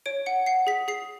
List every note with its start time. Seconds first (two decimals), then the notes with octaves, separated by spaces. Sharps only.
0.06 C#5 D7
0.26 F#5 C#7
0.46 F#5 C7
0.67 G#4 B6
0.88 G#4 C7